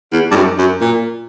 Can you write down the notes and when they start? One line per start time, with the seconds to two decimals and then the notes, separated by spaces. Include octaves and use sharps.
0.13 E2
0.31 G2
0.35 F#2
0.58 F#2
0.81 A#2